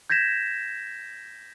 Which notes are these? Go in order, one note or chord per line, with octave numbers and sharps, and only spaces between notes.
G6 G#6 A#6 B6 E7